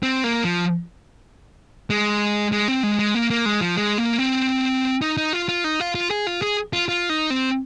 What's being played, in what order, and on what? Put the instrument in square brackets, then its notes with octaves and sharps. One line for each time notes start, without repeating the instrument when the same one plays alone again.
[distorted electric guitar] C4
A#3
F3
G#3
G#3
C4
G#3
G#3
A#3
A#3
G#3
F3
G#3
A#3
C4
D#4
D#4
F4
F4
D#4
F4
F4
G#4
F4
G#4
F4
F4
D#4
C4